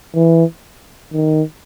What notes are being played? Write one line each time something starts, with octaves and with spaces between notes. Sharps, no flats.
E3
D#3